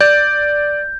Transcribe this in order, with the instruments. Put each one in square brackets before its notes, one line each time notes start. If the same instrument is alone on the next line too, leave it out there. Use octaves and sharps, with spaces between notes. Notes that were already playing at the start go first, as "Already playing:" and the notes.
[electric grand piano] D5 [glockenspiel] G6